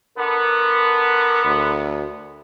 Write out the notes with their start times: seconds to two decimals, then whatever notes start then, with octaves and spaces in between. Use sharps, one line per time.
0.18 D3 B3 A#4
1.45 D2